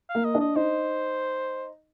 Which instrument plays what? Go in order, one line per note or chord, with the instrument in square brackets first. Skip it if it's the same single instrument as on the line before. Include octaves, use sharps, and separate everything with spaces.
[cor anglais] F5
[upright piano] A#3
[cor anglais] D#5
[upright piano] D4
[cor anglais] D#5
[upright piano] D#4 [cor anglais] C5